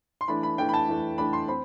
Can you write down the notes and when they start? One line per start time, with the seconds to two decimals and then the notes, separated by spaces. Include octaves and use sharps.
0.21 C6
0.28 E3 A3 D4 B5
0.43 B5
0.58 E3 A3 D4 G5
0.69 B5
0.74 A5
0.88 E3 A3 D4
1.18 E3 A3 D4 B5
1.33 C6
1.48 C4 B5